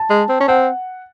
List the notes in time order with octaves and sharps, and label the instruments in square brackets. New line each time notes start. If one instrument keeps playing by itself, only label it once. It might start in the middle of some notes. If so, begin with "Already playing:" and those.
Already playing: [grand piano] A5
[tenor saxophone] G#3
C4
C#4
[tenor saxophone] C4 [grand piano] F#5